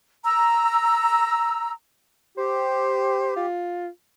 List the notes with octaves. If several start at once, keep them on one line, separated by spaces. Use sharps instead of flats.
A#5 E6
G4 C5
F4